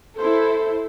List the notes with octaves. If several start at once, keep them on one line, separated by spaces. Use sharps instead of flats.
E4 A4 C5